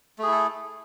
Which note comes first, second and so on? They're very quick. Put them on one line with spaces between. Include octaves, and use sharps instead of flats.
A3 G#4 E4 A4